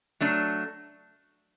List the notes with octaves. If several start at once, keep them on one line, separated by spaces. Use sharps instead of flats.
F#3 A3 D4